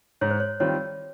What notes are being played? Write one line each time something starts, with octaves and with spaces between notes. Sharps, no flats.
G#2 C#5
C5
C#5
D#3 G3 C4 F4 C#5